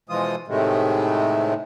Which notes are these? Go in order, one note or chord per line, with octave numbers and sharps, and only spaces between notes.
B2 E3 F3 G#3 F4 D#6
A2 C3 D#3 G#3 A3